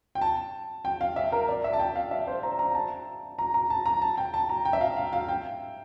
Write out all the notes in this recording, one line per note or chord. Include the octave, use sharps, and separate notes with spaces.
G5
A5
G5
F5
E5
A#4
D5
E5
A5
G5
F5
E5
C5
A#5
A#5
A5
A#5
A#5
A5
A#5
A5
G5
A5
A#5
G5
E5
F5
F5
F5
G5